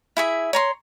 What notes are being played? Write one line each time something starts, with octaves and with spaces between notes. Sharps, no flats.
E4 G#4 E5
C#5 A#5 C6